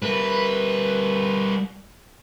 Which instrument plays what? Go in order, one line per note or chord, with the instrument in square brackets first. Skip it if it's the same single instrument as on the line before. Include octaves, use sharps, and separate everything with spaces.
[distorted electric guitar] G3 A#4 [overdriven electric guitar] B4